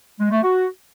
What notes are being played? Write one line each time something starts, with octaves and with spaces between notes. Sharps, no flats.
G#3
A3
F#4